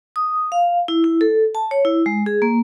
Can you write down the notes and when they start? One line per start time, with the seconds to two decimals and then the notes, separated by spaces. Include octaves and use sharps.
0.16 D#6
0.52 F5
0.88 E4
1.04 E4
1.21 A4
1.55 A5
1.71 C#5
1.85 E4
2.06 G#3
2.26 G#4
2.42 A#3